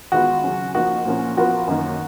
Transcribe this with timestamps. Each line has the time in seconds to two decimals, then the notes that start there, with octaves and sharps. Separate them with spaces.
0.12 D#3 G#3 B3 F4 F#4
0.44 C#3 F#3 C#4
0.75 F3 A#3 D#4 F#4 A#4
1.05 A#2 F3 A#3 C#4
1.37 F3 B3 F4 F#4 A#4
1.67 F#2 D#3 A#3